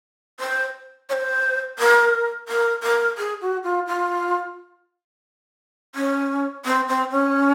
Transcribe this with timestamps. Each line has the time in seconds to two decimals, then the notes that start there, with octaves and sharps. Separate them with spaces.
0.40 C5
1.09 C#5
1.13 C5
1.78 A#4
2.48 A#4
2.83 A#4
3.17 G#4
3.41 F#4
3.63 F4
3.87 F4
5.95 C#4
6.65 C4
6.87 C4
7.11 C#4